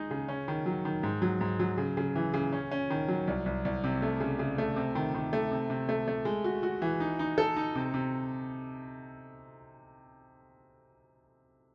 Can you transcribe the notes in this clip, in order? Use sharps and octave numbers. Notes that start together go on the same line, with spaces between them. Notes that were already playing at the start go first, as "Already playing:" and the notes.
Already playing: G#3 D#4 G#4
C#3
C#4
D#3
F#3
D#3
G#2
F#3
G#2
F#3
C#3
C#3
E3
C#3
C#4
C#4
D#3
F#3
C2
C2
C2
C3
A3
C#3
C#3
A3
C3
D#3
D#3
A3
C3
C3
A3
A3
G#3
F#4
F#4
E3
D#4
D#4
A4
D#4
C3
C3